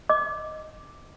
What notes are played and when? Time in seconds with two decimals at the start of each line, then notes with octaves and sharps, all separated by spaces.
0.09 D#5 D6